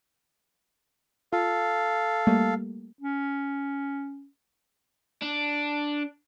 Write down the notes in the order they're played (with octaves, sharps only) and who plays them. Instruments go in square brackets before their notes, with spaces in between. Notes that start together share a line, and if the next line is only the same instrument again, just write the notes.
[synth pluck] F4 [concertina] A4 F5
[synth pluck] G3 A3 A#3
[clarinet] C#4
[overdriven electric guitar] D4